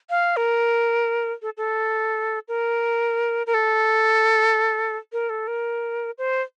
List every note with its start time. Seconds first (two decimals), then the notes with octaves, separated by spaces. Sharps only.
0.10 F5
0.37 A#4
1.42 A4
1.57 A4
2.48 A#4
3.47 A#4
3.54 A4
5.13 A#4
5.30 A4
5.47 A#4
6.18 C5